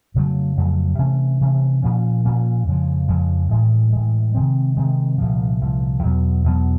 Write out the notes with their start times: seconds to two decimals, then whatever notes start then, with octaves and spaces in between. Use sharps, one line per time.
0.14 F2 C#3 F#3 A3
0.57 F2 C#3 F#3 A3
0.99 C3 E3 A3 C#4
1.41 C3 E3 A3 C#4
1.82 A#2 F3 A#3 C#4
2.25 A#2 F3 A#3 C#4
2.67 F2 C#3 F3 G#3
3.08 F2 C#3 F3 G#3
3.51 A2 E3 G#3
3.93 A2 E3 G#3
4.34 C3 D#3 G#3 C4
4.77 C3 D#3 G#3 C4
5.18 C2 A#2 F3
5.61 C2 A#2 F3
6.03 E2 B2 F#3 B3
6.44 E2 B2 F#3 B3